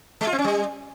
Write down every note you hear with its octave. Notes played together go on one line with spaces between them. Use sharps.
G#3
F4
C4
C#4
G3